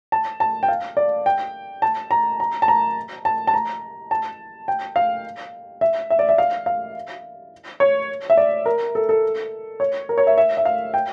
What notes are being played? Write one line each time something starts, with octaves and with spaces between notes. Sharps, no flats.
A5
A5
G5
F5
D5
G5
A5
A#5
A#5
A5
A#5
A5
A5
A#5
A5
G5
F5
E5
E5
D5
E5
F5
F5
C#5
E5
D5
A#4
A4
A4
C#5
A#4
C#5
E5
E5
E5
F5
G5